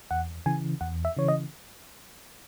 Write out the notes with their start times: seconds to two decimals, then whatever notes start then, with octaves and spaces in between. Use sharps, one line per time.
0.11 E2 F#5
0.46 C#3 E3 G#5
0.81 E2 F#5
1.05 E5
1.17 C#3 E3 C#5
1.28 D#5